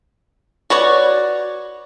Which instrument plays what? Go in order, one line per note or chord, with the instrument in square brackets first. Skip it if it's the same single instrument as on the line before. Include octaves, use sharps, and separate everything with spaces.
[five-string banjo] F#4 B4 C#5 D5